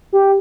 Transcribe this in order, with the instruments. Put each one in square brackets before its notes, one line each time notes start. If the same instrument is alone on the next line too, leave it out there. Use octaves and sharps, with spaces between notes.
[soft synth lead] G4